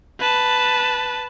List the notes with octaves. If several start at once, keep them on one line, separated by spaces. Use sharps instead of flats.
B4 A5